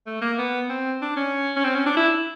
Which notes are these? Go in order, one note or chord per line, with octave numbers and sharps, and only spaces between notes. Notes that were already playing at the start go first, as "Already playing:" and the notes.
A3
A#3
B3
C4
D4
C#4
C#4
C4
C#4
D4
E4